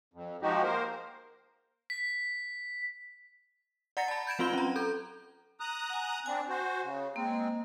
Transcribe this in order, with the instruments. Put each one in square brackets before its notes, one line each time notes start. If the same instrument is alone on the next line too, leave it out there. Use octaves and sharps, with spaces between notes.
[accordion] F2
F3 G#3 D#4 F#4 G4
A#3 A#4 C5
[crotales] B6
[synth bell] D5 F#5 A#5 A6 A#6 C#7
A5 B5
G6 G#6 D7 E7
F#3 C4 F4 C6 G7
C#4 A#5
A4 G6
[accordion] A#5 D#6 F#6
[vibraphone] F#5 G#5
[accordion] C4 D4 [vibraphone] G#5
[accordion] F#4 C5
C#3
[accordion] G#3 C4 [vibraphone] A#3